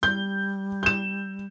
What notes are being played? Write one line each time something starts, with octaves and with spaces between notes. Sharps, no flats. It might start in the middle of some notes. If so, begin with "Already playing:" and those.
G3 G6
G6 E7